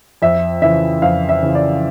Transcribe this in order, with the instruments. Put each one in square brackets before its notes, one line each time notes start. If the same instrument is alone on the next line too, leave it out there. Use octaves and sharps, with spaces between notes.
[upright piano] F2 E5
C#3 E3 E5
F2 F5
E5
C#3 E3
D5